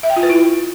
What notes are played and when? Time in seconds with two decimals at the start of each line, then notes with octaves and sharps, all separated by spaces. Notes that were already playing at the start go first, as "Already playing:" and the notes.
0.03 E5
0.10 G5
0.16 F4
0.23 B4
0.30 E4